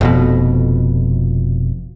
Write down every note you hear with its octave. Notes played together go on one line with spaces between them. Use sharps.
F1 F2 B2